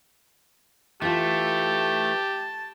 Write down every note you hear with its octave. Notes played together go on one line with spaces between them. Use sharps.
E3 A3 F4 G4 A5